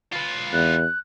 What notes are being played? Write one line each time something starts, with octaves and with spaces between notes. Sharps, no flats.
F4 B4
E2 F#6